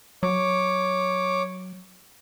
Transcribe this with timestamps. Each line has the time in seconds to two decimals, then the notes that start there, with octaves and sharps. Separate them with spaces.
0.23 F#3 C#5 D6